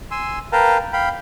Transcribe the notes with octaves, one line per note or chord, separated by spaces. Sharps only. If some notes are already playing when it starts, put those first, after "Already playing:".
G#5 C6 E6
A#4 B4 F5 G5 A5 A#5
F5 G5 B5